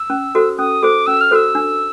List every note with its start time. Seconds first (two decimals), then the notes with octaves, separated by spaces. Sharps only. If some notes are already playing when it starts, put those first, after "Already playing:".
Already playing: E6
0.10 C#4
0.35 F#4 A4 C5
0.58 C#4 D#6
0.83 F#4 A4 C5 D6
1.07 C#4 E6
1.21 F6
1.31 F#4 A4 C5 E6
1.55 D4